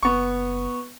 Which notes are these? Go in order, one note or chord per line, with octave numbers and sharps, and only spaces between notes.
F#1 B3 C#6